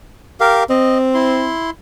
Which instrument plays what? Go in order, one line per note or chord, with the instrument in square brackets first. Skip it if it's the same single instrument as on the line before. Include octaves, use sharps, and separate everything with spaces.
[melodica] G4 A#4 F5
[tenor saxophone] C4 [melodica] D#5
[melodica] E4 C6